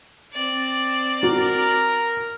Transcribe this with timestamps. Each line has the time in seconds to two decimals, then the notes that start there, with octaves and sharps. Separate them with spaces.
0.32 C4 D5
1.23 F#4 A#4